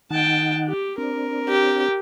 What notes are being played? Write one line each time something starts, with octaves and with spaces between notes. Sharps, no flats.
D#3 D#4 F#5 G5 A5
G4
C4 D4 A#4
G4